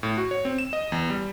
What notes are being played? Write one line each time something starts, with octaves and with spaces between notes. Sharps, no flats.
A2
F#4
C#5
C4
E7
D#5
E2
G3